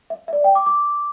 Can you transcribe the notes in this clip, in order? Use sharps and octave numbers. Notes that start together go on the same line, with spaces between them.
E5
E5
D5
G5
D6
D6